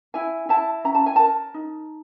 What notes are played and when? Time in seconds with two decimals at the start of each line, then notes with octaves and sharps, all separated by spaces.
0.14 E4 G#5
0.49 E4 A5
0.84 C#4 A#5
0.95 A5
1.06 G#5
1.16 A#4 A5
1.54 D#4